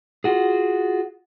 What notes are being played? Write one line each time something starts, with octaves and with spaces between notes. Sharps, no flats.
F4 F#4 G#4